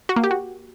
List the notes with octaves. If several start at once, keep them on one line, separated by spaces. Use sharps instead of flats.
F#4
A#3
G4
F#4